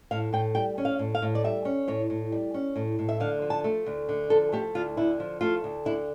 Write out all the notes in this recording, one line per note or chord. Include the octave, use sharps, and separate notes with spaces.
A2 F5
A2 G5
G3 G5
C#4
F5
A2
F5
A2
D5
G3 E5
C#4
A2 C#5
A2
G3
C#4
A2
A2
E5
D3 F5
F3
A5
A3
D2
D3
F3 A4
A3 G4
D2 F4
D3 E4
F3
A3 F4
D2
D3 E4